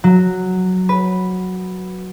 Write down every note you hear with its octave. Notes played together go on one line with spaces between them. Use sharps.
F#3
B4